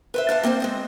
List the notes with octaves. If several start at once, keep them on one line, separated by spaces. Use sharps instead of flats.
B4 C5 E5
D4 F5 F#5 A5
A#3 C4 D4 C5
G#3 C4 D#5